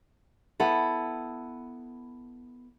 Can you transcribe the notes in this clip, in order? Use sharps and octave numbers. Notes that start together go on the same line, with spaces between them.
B3 E4 A4